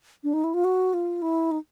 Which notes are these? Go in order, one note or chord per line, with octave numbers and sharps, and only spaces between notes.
D4
D#4
E4
F4
F#4
F4
E4
D#4